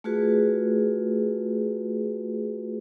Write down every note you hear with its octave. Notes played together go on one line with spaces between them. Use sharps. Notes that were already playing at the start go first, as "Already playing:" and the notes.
A3 F4 F#4 G#4 B4